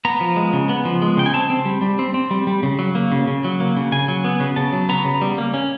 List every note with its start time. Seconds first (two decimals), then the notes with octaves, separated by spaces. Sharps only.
0.05 B3 A#5
0.21 F3
0.36 G#3
0.53 C#3
0.69 B3
0.85 F3
1.02 G#3
1.17 C#3 G5
1.26 G#5
1.34 C4 A5
1.50 C4
1.65 G3
1.82 G3
1.99 C4
2.14 C4
2.31 G3
2.47 G3
2.63 C#3
2.79 F#3
2.95 A#3
3.12 C#3
3.27 C#3
3.44 F#3
3.60 A#3
3.77 C#3
3.92 C#3 G#5
4.08 F#3
4.25 B3
4.40 C#3
4.56 C#3 A5
4.73 F#3
4.89 B3 A#5
5.05 C#3
5.21 G3
5.38 A#3
5.54 C#4